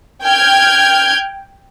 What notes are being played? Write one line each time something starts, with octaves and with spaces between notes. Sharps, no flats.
G5 F6 G6 G#6